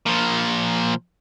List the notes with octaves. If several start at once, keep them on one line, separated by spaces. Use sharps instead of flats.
A#2 F3